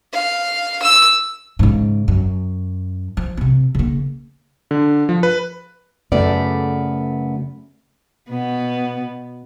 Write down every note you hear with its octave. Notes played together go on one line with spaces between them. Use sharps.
F5
E6
G#2 C#3
F#2
F3
C3 C4
C#3 A#3
D3
F3
B4
F#2 C#3 A3 B3 D5
B2 B3